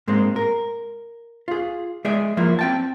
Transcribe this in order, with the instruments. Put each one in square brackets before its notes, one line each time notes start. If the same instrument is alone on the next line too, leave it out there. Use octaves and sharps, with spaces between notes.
[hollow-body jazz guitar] G#2 G#3 A#3 C4
A#4
F4 G#4
G#3 G#4 D5 E5
F3 F#3 A#3 E4 F4
C4 G5 A5